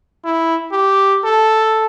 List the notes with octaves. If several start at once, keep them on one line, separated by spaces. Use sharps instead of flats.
E4
G4
A4